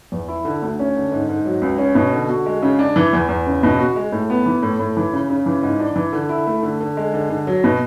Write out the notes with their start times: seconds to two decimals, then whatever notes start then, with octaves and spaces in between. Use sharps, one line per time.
0.12 E2
0.28 E4
0.45 D3
0.62 D2
0.79 C#4
0.96 D3
1.12 G#2
1.29 G#2
1.46 F#3
1.62 C#2
1.78 C#4
1.95 B2
2.13 D3
2.29 F#4
2.46 G#3
2.62 C#3
2.79 D4
2.96 E3
3.13 E2
3.29 E2
3.46 C#3
3.63 B2
3.79 F#4
3.96 G#3
4.12 A2
4.30 B3
4.46 E3
4.63 A2
4.80 A2
4.97 E3
5.13 C#3
5.30 C#3
5.46 E3
5.62 G#2
5.80 D4
5.96 E3
6.13 D3
6.29 E4
6.47 A3
6.63 D3
6.80 D3
6.97 G#3
7.14 D3
7.30 D3
7.47 F#3
7.64 B2